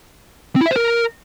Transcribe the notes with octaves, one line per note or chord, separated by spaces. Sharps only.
C4
E4
E5
C5
A#4